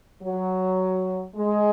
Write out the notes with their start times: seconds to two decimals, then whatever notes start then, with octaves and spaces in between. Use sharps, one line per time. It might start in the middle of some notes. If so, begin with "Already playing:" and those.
0.23 F#3
1.36 G#3